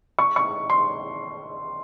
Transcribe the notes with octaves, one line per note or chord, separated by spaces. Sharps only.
C#6
C#6
C6